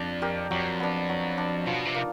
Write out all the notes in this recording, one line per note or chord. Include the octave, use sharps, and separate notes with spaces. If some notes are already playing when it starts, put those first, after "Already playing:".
Already playing: F2 D4
G4 A#4
F2 F#3
B3 D4
F#3
B3 D4
B2 F3
C3
A#3 D#4